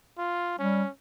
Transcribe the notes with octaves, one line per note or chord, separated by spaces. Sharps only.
F4
G3 C#4